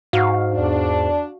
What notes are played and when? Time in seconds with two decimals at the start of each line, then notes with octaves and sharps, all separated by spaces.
0.13 G#2 F#4 F5
0.52 E2 D4